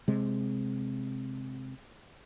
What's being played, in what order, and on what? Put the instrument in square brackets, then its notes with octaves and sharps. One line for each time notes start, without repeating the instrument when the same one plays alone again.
[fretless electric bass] C3 G#3